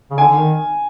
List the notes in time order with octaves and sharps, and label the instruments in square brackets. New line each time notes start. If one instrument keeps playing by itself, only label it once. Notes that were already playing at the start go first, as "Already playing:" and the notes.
[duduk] C#3
[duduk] D3 [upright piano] G#5
[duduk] D3
D#3